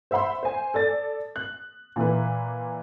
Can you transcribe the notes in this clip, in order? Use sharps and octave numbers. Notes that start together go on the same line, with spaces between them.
C5 E5 F#5 B5 C6
C5 G#5
A4 D5 A6
F#6
A#2 E3 E4 B4